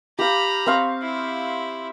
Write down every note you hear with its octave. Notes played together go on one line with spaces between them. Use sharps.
G4 F5 A#5 B5
C4 F5 C#6
E4